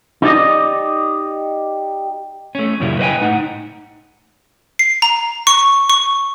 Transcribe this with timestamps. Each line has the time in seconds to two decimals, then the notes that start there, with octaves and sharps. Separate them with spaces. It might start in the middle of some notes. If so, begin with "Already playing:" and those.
0.22 D#4 G4 D5 D#5
2.55 A3 C#4
2.80 F#2 A#2 C#3 G3 E4
2.99 B4 C5 D#5 F5 G5 G#5
3.21 A2 D#4 F#5
4.79 C7
5.02 A#5
5.47 C#6
5.90 C#6